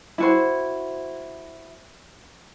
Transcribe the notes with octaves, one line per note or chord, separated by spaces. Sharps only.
E4 F#4 C5